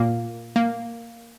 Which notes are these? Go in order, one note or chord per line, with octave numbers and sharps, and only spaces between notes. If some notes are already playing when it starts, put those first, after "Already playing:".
Already playing: A#2 A#3
A#3